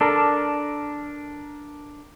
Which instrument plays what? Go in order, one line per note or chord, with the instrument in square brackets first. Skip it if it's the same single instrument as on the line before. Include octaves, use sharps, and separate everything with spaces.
[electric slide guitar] D4 A4 A#4